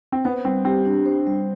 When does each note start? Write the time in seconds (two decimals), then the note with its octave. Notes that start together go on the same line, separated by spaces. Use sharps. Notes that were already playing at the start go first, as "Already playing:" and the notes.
0.12 C4
0.25 B3 C5
0.45 G3 C4
0.65 C4 G4
0.85 D4
1.06 C5
1.27 G3